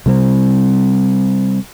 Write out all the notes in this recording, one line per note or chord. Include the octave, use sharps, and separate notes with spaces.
C3 G3 C4